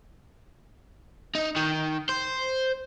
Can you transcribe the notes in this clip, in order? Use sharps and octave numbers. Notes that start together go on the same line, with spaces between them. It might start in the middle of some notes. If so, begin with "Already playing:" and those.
D#4
D#3
C5